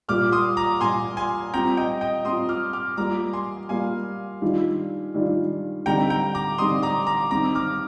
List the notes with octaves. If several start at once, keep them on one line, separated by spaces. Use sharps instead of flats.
A#2 G3 A#3 F4 D6 F6
C6 D#6
A#5 D6
A#2 G3 A#3 F4 G#5 C6
G#5 C6
G3 C4 F4 G5 A#5
D#5 G5
D#5 G5
G3 C4 F4 C6 D#6
D6 F6
D6 F6
G3 A#3 F4 A#5 D6
G#5 C6
G3 A#3 F4 F5 G#5
D#3 G3 D4 F4
D#3 G3 D4 F4
D3 G3 C4 D#4 G5 A#5
G5 A#5
A#5 D6
D3 G3 C4 D#4 C6 D#6
A#5 D6
A#5 D6
D#3 G3 C4 A#5 D6
D6 F6